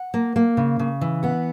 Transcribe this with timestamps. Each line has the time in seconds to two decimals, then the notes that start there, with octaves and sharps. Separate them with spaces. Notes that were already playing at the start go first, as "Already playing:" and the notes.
Already playing: F#5
0.14 A#3
0.36 A#3
0.57 C#3
0.79 C#3
1.01 E3
1.23 B3 F#5